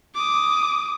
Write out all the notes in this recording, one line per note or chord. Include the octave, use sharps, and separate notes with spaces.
D6 D#6